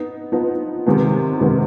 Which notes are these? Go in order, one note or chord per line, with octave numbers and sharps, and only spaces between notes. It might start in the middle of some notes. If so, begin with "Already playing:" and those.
Already playing: B3 D#4
F3 B3 D#4
C3 D#3 G#3 B3
C3 D#3 G#3 B3